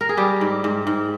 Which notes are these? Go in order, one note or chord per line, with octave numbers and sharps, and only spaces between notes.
A#4
G#4
G3 G4
G#2
G#2
G#2